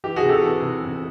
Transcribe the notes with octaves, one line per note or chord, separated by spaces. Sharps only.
E3 G4
F#4 G#4
C3
G4 A4
E3
C3
E1